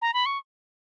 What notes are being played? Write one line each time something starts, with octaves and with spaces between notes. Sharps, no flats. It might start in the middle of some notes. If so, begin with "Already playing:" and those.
A#5
B5
C#6